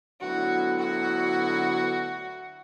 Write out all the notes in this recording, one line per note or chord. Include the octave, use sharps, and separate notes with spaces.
D2 D3 F#3 B3 E4 F#4
F#4